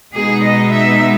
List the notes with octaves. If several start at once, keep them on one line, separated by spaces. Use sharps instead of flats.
B2 G#3 B3 D#4 G#4
D#5
E5